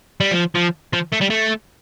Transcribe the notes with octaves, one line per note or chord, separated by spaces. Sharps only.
G3
F3
F3
F3
A3
G3
A3